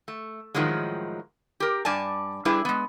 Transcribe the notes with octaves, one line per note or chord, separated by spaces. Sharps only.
A3
A2 D#3 F3 F#3 G#3
G4 A#4
G2 D5 G#5 A5
G3 D4 E4 G#4 B4 E5
G#3 B3